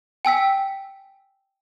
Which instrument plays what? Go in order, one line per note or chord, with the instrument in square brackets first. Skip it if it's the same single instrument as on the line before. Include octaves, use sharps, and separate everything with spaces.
[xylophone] G5 G#5 E6 B6